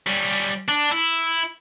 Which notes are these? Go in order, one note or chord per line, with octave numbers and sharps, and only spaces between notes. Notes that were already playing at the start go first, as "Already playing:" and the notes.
G3 C#4
D4
E4